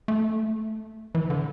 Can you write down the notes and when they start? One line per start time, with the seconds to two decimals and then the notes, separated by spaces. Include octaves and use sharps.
0.08 A3
1.15 E3
1.30 D3